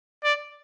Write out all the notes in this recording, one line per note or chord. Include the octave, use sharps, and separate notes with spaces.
D5